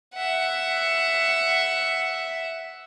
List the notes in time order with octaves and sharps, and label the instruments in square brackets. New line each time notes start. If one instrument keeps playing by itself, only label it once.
[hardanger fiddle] E5 F#5